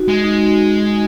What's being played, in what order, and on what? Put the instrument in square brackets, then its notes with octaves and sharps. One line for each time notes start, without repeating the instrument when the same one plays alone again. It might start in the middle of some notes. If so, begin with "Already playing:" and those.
Already playing: [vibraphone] D#4 F#4
[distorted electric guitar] G#3
[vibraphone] D#4